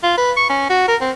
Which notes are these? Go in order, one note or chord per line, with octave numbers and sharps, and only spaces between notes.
F4
B4
C#6
C#4
F#4
A#4
C4